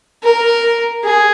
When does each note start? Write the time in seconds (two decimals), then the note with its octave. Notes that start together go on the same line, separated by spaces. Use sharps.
0.23 A#4
1.03 G#4